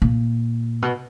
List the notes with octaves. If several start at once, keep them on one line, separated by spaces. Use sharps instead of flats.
A#2
B2